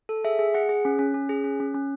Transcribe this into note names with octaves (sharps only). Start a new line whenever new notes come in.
A4
G#4 E5
G#4
G#4 F#5
G#4
C#4
C#4
C#4
G#4
C#4
C#4
C#4